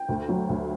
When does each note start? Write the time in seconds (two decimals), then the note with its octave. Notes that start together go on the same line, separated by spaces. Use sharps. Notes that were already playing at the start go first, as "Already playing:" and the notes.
Already playing: G5
0.09 D2
0.29 F#3
0.49 D2